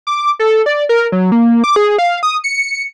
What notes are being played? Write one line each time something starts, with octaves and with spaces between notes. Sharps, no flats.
D6
A4
D5
A#4
F#3
A#3
D6
G#4
F5
D#6
C#7